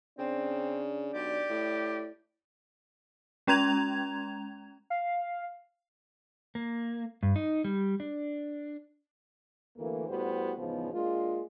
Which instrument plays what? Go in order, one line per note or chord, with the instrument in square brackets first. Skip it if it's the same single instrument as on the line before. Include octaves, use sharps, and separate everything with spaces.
[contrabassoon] C#3 [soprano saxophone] C4 [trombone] D4
[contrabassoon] B1 [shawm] G4 [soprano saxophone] D5
[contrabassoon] A2
[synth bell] G#3 C#4 A#5 G#6 F7
[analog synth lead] F5
[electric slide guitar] A#3
G2
D#4
G3
D4
[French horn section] D2 E3 A3 A#3
A2 G3 B3 F#4 C5
E2 G#2 C#3 F3 B3
G#3 A#3 D4 F4